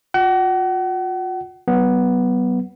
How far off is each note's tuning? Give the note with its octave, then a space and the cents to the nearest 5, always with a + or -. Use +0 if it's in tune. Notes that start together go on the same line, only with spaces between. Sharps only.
F4 +40 F#5 +35
F#3 +35 B3 +0